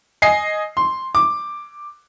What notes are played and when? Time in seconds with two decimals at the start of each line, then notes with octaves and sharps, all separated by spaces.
0.22 D#5 G#5 C7
0.77 C6
1.15 D6